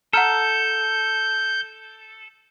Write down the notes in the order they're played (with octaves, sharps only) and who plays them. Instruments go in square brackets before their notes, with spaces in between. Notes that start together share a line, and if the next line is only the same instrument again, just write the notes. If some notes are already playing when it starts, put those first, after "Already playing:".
[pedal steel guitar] A4 [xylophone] F#5 A#5 F6 [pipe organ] G6